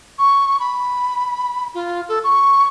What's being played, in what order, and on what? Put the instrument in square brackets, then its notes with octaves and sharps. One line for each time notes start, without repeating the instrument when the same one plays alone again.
[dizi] C#6
B5
F4
A4
C#6